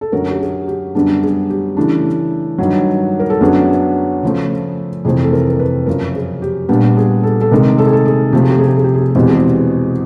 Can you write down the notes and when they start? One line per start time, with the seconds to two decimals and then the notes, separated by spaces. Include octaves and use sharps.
0.01 A4
0.12 F#2 D3 F#3 A#4
0.31 G4
0.40 G#4
0.68 G4
0.95 F#2 D3 G3 B3 D4 G#4
1.22 G#4
1.50 G4
1.77 C#3 E3 A3 D4
2.58 G2 D#3 F#3
3.19 A#4
3.30 A4
3.41 F#2 D3 F#3 B3 D4 G#4
4.23 C#3 F3 A3
5.05 F2 C3 E3 A3 C4 G#4
5.24 A4
5.33 A#4
5.49 A#4
5.59 B4
5.86 F#2 C#3 F3 A#4
6.15 G#4
6.42 G4
6.69 A#2 G3 B3 D4 G4
6.97 G#4
7.23 A4
7.41 A4
7.51 C3 D#3 G#3 A#4
7.78 A4
7.86 G#4
7.93 A4
8.05 G#4
8.32 C3 F3 A3 G4
8.42 G#4
8.50 G4
8.58 G#4
8.67 G4
8.76 G#4
8.84 G4
8.94 G#4
9.01 G4
9.10 G#4
9.15 E2 B2 G#3 C4 G4
9.28 G#4
9.35 G4